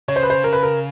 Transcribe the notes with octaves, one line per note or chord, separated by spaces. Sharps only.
C#3 C#5
C5
B4
C5
A#4
B4
A#4